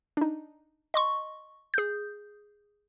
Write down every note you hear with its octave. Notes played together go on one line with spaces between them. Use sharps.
D4 D#4
D#5 C6 C#6
G#4 G6